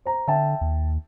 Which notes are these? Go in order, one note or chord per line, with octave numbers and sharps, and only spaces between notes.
C5 A#5
D3 E5 G5 A5
D#2